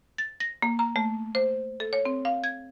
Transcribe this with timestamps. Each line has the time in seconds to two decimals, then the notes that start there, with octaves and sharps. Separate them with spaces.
0.18 A6
0.40 A#6
0.62 A#3
0.79 A#5
0.96 A3
1.35 C5
1.80 A4
1.93 C#5
2.05 C4
2.25 F5
2.44 G#6